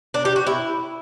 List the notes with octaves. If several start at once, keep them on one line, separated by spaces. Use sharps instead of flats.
D4
G4
F#4
E4